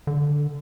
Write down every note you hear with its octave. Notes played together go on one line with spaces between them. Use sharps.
D3